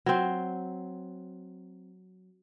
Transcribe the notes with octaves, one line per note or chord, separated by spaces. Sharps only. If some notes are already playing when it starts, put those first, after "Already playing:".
F#3 C4